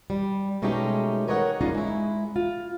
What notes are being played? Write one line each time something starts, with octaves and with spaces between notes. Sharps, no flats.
G3
B2 G#3 A3 C#4 D#4 G4
G#4 A#4 B4 C#5 D#5 F#5
C#4 D#4 F4 D5 D#5
G#3 E4
F4